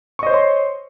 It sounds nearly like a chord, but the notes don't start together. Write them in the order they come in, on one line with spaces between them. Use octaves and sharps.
C#6 D#5 C5 C#5 C6